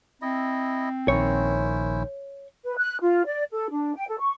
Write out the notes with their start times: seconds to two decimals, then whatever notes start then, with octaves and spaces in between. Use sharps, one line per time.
0.22 C4 E4 D#5
1.08 A#1 D#3 C#4 E4 C5 C#5
2.64 B4
2.77 F#6
3.01 F4
3.25 D5
3.51 A4
3.71 D4
3.95 G5
4.08 A4
4.20 C#6